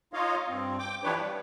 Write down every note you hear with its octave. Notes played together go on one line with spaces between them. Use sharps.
D#4 F4 C#5 D#5 F5
G2 C4
G5 D6
E3 F3 D4 G4 B4 C#5
G3